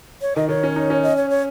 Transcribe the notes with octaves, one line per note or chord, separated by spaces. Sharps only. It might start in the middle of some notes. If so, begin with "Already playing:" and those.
C#5
D#3 D#5
D#3 C#5
C#4
D#4
C#4
D#5
C#5
C#5